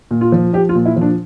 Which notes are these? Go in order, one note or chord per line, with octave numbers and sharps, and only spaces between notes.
A#2
F4
F3
F3 G4
F4
A#2
E4
F3
D4